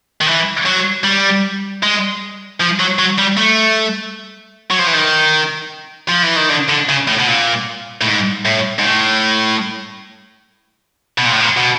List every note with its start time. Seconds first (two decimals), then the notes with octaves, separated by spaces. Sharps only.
0.21 D#3
0.26 E3
0.66 F#3
1.04 G3
1.83 G#3
2.60 F3
2.79 F#3
2.99 F#3
3.19 G3
3.38 A3
4.70 F#3
4.79 F3
4.87 E3
4.94 D#3
6.09 F3
6.23 E3
6.37 D#3
6.49 D3
6.69 D3
6.89 C#3
7.08 A2
7.20 B2
7.28 A#2
8.01 A2
8.05 G#2
8.45 A2
8.79 G#2
8.84 A2
11.18 B2
11.25 A#2
11.33 A2
11.40 A#2
11.57 B2